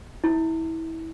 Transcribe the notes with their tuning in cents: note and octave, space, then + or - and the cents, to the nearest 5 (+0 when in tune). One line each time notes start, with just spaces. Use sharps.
E4 -25